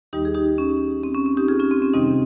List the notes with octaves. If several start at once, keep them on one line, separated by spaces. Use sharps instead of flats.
D#2 D#3 G3 D#4 G4
G#4
D#4 G4
C#4
C4
C#4
C#4
D#4 G4
F4 G#4
C#4 F4
C4
C#4
F2 C3 D#3 G3 C4 D#4